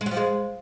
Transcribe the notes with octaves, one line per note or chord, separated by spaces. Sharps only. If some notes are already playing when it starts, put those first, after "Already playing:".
G#3
F#3
F3
G#3